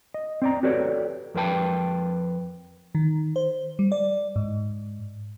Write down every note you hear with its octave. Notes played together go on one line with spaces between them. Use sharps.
D#5
C4 D5 A#5
F#4 G4 A4 B4 C#5 D5
F2 A#4 B4 G5 A5
D#3
C5
G3
D5
G#2